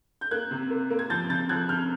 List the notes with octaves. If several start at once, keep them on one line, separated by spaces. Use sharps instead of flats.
G6
A#3 F#6 G#6
C3
A#3
A#3
G#6
F3 G6 A6
C3 G6 A6
F3 F#6 G#6
C3 F6 G6